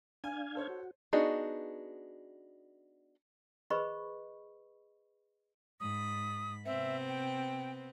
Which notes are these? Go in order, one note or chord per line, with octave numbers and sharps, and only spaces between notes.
D4 F5 G#5 G#6
A4 C5 C#5
F#4
B3 D4 D#4 F#4 G#4
G#4 B4 C5 D#5 B5 C#6
G#2 B5 D#6
C3 B3 C4 E5
G5